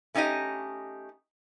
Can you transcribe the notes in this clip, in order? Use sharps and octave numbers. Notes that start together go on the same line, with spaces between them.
A3 C#4 D#4 G4 D#5